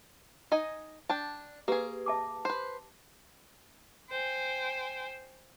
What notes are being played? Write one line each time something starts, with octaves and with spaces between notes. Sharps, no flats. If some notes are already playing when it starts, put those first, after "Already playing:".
D#4 D#5 G#5
D4 G5 A5
A#3 G4 G#4 B4
E5 A5 D6
B4 C5
C5 G5 G#5